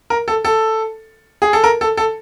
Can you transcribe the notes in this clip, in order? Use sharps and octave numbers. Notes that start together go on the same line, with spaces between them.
A#4
A4
A4
G#4
A4
A#4
A4
A4